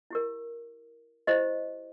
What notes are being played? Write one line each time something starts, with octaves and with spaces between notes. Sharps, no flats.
E4 G4 A#4
E4 G4 C5 D#5